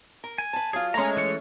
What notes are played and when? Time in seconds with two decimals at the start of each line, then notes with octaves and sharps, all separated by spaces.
0.24 A#4
0.38 G#5
0.53 B4 A5
0.73 F#3 F4 G#4
0.94 G#3 A3 C#4 C#5 A#5
1.16 E3 A4 C#6